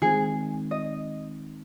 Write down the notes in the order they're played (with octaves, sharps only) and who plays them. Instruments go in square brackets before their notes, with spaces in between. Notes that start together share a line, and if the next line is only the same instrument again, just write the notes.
[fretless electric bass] D#3 G#3 C4 [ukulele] G#4
[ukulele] D#5